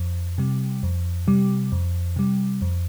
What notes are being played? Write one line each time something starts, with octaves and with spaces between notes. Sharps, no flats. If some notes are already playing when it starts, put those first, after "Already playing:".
Already playing: F2
C3 G3
F2
C3 G3
F2
C3 G3
F2